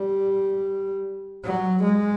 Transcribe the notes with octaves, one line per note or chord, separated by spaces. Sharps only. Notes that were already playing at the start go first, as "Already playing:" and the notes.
Already playing: G3
F#3
G#3